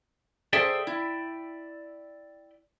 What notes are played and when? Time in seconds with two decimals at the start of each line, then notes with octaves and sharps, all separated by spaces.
0.53 G#4 A4 C5 D5 E5 G5
0.87 E4